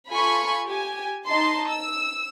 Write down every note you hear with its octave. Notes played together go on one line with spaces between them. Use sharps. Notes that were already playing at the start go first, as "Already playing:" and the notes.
F4 A4 G#5 B5 C#6
G4 G#5
D#4 D#5 A5 C6
E6